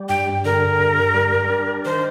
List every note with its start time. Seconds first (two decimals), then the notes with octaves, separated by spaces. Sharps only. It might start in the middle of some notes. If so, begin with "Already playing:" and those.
Already playing: G3
0.09 G2 G5
0.45 D3 A#4
0.79 G2
1.14 G3
1.50 D4
1.85 D#3 C5